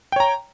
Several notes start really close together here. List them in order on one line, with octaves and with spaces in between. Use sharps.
G5 C#5 A#5